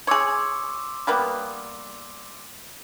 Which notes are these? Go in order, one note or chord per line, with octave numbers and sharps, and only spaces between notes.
G#4 C#5 C6 D6 E6
G3 A#3 B3